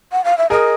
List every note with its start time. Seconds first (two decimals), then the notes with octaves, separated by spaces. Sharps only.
0.12 F#5
0.24 F5
0.38 E5
0.50 G#4 A#4 D#5